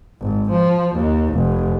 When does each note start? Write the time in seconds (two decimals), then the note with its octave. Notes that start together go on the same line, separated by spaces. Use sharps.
0.21 G#1
0.51 F3
0.95 D#2
1.34 F1